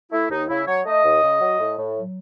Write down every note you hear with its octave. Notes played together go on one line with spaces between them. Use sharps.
A3 E4
D#2 D#4
C#3 E4
F#3 C#5
A3 D#5
D#2
C#3
F#3
A2
A2
F#3